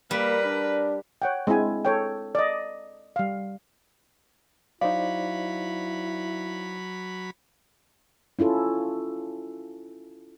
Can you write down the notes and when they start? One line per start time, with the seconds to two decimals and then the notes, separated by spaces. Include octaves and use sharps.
0.11 G3 A#3 A#4 B4
0.44 D4
1.22 C#5 F#5 G5
1.47 G#3 C4 D4 E4 G#5
1.85 A4 C#5 G5
2.35 D5 D#5
3.16 G3 F5
4.81 F#3 D#4 E4 C5 D5 F5 B5
8.39 C#4 E4 F4 A4